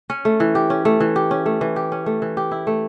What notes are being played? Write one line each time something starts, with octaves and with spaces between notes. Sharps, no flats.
C#4
A3
E3
G4
C#4
A3
E3
G4
C#4
A3
E3
G4
C#4
A3
E3
G4
E4
A3